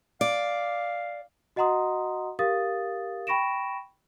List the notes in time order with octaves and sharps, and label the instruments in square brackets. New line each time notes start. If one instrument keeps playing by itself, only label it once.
[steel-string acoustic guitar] D5 [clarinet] F5
[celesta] F#4 D#5 F#5 A#5 C6 D#6
G4 A#4 F5 D#6 A6
G5 B5 C#6 A#6 D7 E7